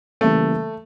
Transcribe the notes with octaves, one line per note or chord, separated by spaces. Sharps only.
C#3 E3 G3 A3 A#3